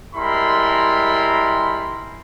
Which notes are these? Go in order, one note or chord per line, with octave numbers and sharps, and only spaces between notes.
G3 G#3 E4 A#4 B5 C6